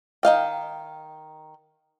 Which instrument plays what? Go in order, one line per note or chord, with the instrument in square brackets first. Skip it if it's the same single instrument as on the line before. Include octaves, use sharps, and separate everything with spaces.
[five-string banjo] D#3 D#5 F5 G5